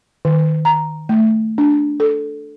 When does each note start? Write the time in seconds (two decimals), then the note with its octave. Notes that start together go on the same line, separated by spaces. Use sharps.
0.25 D#3
0.65 A#5
1.09 A3
1.58 D4
2.00 A4